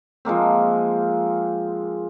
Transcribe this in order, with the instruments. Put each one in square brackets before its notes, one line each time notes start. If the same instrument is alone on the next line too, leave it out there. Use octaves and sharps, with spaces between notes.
[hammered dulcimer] F3 G#3 A#3 C4